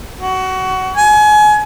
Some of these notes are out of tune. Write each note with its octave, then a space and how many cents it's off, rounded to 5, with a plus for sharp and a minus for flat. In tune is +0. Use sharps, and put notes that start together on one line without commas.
F#4 +20
G#5 +30